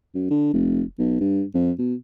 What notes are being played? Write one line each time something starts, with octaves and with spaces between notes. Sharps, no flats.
F#2
D3
F1
B1
G2
F2
B2